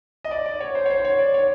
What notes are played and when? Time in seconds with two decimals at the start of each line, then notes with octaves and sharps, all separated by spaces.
0.25 D#5
0.31 D5
0.46 D5
0.61 C#5
0.75 C5
0.86 C#5
0.90 C5
1.05 C#5
1.19 D5
1.34 C#5